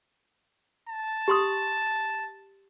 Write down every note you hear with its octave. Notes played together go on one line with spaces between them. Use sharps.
A5
G4 C6 D#6